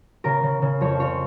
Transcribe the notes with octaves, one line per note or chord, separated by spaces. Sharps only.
C#3 A#4
C#3
C#3
F2 C#5
C#3 C#5